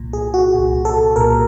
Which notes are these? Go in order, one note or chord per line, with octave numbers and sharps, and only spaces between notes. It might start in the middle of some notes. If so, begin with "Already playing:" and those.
Already playing: C2 A#2
G#4
F#4
C2 A#2
A4
C2 A#2 A#4